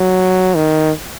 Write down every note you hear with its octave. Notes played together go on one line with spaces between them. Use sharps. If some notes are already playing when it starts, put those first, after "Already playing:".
Already playing: F#3
D#3